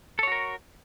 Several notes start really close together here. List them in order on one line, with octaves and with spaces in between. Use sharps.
A4 C#5 F#4 A#4